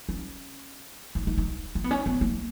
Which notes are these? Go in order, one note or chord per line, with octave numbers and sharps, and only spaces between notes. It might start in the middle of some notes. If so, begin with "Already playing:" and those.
C#4
D#4
D#4
D#4
D#4
B3
C#4
B3
A#3